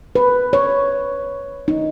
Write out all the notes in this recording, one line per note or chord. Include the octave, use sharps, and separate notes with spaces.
B4
C#5
D#4